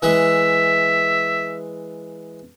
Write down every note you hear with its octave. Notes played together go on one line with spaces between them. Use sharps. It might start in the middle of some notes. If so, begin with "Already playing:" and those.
E3 G#3 G#4 E5